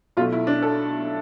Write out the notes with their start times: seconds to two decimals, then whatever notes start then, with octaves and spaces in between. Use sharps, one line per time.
0.17 B1 B2 A3 F4
0.33 E4
0.47 D4
0.62 A4